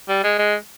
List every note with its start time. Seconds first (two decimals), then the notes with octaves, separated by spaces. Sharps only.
0.09 G3
0.24 G#3
0.39 G#3